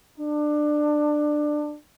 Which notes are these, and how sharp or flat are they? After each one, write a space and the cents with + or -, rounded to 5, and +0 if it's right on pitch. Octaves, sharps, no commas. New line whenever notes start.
D4 +20